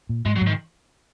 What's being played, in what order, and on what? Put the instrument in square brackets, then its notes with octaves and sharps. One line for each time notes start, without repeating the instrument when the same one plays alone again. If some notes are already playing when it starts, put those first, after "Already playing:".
[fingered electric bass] A#2
[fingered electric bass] G#2 [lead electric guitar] G#3
[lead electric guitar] F#3
[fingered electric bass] G#2
[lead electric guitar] D#3